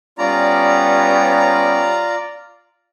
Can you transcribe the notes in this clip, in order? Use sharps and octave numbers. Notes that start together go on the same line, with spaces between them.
G3 B3 C#4 F4 D5 A#5